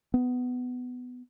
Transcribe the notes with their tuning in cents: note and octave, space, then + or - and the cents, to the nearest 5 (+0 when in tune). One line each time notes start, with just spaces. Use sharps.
B3 +15